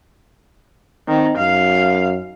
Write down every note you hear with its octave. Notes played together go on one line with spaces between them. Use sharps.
D#3 C4
F#2 F5